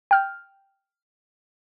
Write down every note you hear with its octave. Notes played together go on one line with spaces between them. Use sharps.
G5 F6 G6